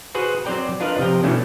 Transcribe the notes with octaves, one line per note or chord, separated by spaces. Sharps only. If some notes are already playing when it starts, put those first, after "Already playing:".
F#4 G#4 B4 C5 F#5
F#3 C4 C5 D5 G5 A#5
D4 F4 A#4 B4 D#5 F5
C3 F3 G5 A#5
B2 E3 A3 C#4 D4